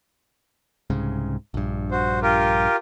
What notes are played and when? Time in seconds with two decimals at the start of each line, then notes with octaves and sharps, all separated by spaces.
0.90 C2 G#2 C#3
1.54 A#1 G2
1.91 F#4 C5
2.22 F4 G4 A#4